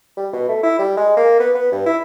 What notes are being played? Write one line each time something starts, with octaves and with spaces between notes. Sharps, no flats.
G3
B2
A3
E4
G3
G#3
A#3
B3
B3
G2
E4